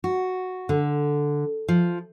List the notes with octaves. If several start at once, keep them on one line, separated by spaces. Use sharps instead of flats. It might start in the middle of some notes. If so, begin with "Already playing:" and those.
F#4
D3
F3